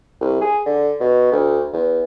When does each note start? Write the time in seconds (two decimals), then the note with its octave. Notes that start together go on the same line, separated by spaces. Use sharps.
0.21 C2
0.41 G#4
0.66 D3
1.01 B2
1.32 D2
1.73 E2